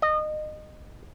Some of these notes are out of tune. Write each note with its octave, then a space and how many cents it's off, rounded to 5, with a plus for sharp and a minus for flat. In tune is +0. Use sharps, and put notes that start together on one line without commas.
D#5 -25